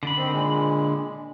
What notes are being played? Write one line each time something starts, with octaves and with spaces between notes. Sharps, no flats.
D3 D4 B5
D#3 C4
A#2 G#3